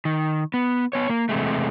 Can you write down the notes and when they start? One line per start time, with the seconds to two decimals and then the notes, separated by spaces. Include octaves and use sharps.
0.05 D#3
0.54 B3
0.93 B3 C#5
1.10 A#3
1.29 E2 C3 G#3 A3